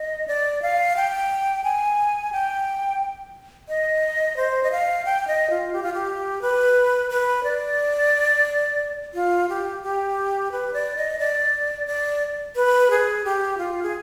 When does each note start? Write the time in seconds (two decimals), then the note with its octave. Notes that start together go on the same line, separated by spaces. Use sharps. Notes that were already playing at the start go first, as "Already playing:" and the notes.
Already playing: D#5
0.28 D5
0.62 F5
0.96 G5
1.64 G#5
2.32 G5
3.69 D#5
4.36 C5
4.63 D#5
4.72 F5
5.05 G5
5.27 D#5
5.50 F4
5.73 G4
5.83 F4
5.94 G4
6.42 B4
7.10 B4
7.43 D5
9.14 F4
9.49 G4
9.83 G4
10.52 B4
10.73 D5
10.96 D#5
11.19 D5
11.87 D5
12.56 B4
12.90 G#4
13.24 G4
13.58 F4
13.83 G#4